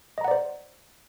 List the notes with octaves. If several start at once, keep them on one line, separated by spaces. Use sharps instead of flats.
C5 D5 D#5 F#5 A#5